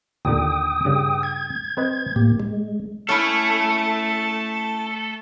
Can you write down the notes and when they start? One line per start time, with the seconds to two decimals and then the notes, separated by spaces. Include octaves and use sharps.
0.25 D#2 A#2 D3 G5 D#6
0.85 G2 C#3
1.23 G#6
1.77 C4 B4 D#5
2.16 A2 A#3 G4
2.40 G#3
3.09 A3 C#4 E4 A4 A5